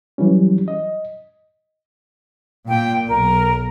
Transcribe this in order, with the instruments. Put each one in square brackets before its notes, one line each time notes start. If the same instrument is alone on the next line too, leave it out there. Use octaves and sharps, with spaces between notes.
[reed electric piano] E3 F#3 G3 C#4
D#5
[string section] A#2 [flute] G5
[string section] B1 [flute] A#4